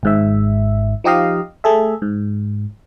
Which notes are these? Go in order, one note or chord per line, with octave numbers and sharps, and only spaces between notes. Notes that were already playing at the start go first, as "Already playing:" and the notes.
G#1 G#2 E5
F3 D#4 G4 D#5 F5
A3 G#4 A4 E5
G#2